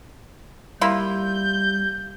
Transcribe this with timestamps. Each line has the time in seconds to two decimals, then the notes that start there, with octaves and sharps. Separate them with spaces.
0.81 G3 A#3 E4 F4 G6